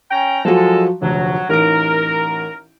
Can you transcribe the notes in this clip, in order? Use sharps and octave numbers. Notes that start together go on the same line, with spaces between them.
C#4 G5 A#5
F3 F#3 G#3 F#4 A4
F1 D2 F#3
A1 D#4 A#4 D7